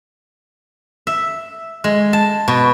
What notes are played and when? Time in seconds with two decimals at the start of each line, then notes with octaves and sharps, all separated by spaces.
1.07 E5
1.84 G#3
2.13 A5
2.48 B2